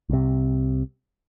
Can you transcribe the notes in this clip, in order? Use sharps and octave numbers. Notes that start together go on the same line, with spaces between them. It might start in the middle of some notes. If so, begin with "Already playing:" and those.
C2 C3